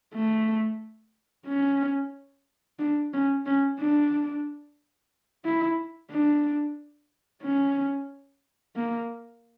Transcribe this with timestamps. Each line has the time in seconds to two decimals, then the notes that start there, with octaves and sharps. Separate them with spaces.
0.15 A3
1.47 C#4
2.79 D4
3.13 C#4
3.46 C#4
3.79 D4
5.45 E4
6.11 D4
7.43 C#4
8.76 A#3